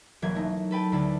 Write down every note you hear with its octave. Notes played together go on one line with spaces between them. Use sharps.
E1 E3 F#3 A#3 G#6
A3 D#4
A4 B4 G5 A5
D2 D3 E4 A5